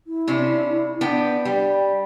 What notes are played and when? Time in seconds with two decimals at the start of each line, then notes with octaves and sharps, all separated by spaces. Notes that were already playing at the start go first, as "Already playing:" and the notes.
0.07 E4
0.28 C3 C#4 D4
1.01 B3 D4 G5
1.45 G3 G5